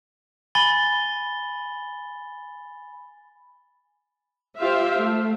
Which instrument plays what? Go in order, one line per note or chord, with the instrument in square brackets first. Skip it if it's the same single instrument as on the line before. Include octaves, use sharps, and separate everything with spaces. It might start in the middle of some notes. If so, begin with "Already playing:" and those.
[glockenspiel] G#5 B5 A6 G7
[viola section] F4 G4 C5 E5 F5
A3